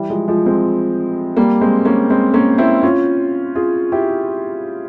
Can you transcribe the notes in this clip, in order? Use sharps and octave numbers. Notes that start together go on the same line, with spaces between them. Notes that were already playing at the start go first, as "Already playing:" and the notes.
Already playing: E3 G3
F3 G#3
F3 G#3
G#3 C4
G3 A#3
G#3 C4
A#3 C#4
G#3 C4
A#3 C#4
C4 E4
C#4 F4
F4 G#4
E4 G4